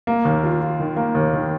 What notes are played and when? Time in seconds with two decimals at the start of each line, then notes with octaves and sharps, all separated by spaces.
0.07 A#3
0.25 D#2
0.44 F4
0.61 F4
0.80 D#3
0.97 A#3
1.15 D#2
1.34 D#3